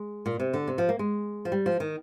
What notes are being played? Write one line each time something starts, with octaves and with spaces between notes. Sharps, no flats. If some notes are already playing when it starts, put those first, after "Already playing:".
Already playing: G#3
A#2
C3
D3
C3
F3
A#3
G#3
F3
G3
F3
D#3